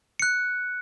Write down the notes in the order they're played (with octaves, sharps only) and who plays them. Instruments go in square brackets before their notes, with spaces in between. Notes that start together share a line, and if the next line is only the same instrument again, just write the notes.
[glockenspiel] F#6 C#7